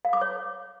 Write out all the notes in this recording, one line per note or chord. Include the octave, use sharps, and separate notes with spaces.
F5
D6
C#5